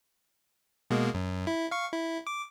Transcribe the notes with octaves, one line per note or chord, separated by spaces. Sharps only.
B2 G#3 A#3
F#2
E4
F5 C#6
E4
D6